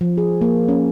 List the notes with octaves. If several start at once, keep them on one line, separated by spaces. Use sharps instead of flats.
F3
G#4
A#3
C#4